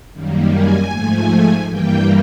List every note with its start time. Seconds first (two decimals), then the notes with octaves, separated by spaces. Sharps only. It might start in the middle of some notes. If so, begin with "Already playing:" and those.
0.13 F#2 D#3 G3 A#3
0.51 G#5
0.90 G#2 F3 A3
1.67 G2 E3 G3 A#3 G5